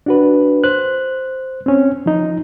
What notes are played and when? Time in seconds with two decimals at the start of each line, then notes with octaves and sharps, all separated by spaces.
0.06 D4 F#4 B4
0.64 C5 F#6
1.66 C4 C#4
2.06 F3 D#4